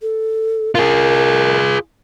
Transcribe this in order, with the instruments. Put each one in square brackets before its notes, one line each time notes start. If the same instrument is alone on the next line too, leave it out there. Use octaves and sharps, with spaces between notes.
[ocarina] A4
[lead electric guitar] F4 G#4 [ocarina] A#4